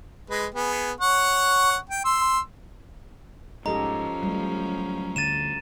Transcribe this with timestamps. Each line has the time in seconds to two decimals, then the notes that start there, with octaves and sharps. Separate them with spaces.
0.30 G#3 B4
0.54 B3 G#4
1.00 C#5 F#5 C#6
1.89 G5
2.05 C6 E6
3.66 G#2 F3 C#4 G4 A4 D#5 A#5
4.23 F#3 G3 A3
5.16 D2 D3 A6 D#7 E7